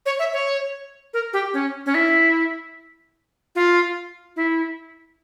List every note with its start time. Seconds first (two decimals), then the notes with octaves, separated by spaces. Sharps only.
0.06 C#5
0.19 E5
0.33 C#5
1.14 A#4
1.33 G4
1.54 C#4
1.86 C#4
1.95 E4
3.55 F4
4.36 E4